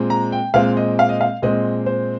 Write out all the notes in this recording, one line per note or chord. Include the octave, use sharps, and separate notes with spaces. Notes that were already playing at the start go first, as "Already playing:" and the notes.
Already playing: A#2 G#3 C4
A#5
G5
A#2 G#3 C4 F5
D#5
F5
D#5
F5
A#2 G#3 C4 D#5
C5